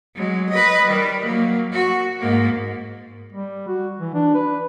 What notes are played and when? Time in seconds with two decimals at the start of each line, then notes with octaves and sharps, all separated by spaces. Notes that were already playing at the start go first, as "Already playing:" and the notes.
0.16 F#3 G#3
0.49 B4 D#5
0.87 D#3 G3
1.25 F#3 A#3
1.73 F#4
2.19 G#2 A#3
3.33 G3
3.68 F#4
3.99 E3
4.14 D4
4.35 B4